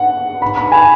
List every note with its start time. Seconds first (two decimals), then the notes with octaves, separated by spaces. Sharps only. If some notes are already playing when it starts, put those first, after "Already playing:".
Already playing: F#5
0.42 B5
0.57 B5
0.72 G#5